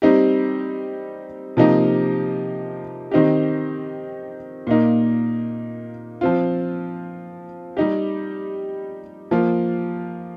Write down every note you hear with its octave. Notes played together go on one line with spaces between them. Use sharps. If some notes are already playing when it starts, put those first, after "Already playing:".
G3 C4 D#4 G4
C3 F3 A#3 D#4 G4
D#3 C4 D#4 G4
A#2 A#3 D#4
F3 C4 F4
G3 D#4 G4
F3 A#3 F4